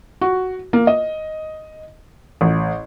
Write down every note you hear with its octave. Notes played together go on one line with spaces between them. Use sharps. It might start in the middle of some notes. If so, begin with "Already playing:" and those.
F#4
A#3
D#5
A1